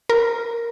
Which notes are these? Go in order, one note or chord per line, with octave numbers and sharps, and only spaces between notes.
A#4